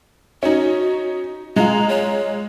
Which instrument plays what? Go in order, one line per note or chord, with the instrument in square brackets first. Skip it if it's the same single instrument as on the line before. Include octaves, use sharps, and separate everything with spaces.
[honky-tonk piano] C#4 D#4 [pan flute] F#4
[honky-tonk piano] G#3 F4 [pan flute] A#5
[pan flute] C#5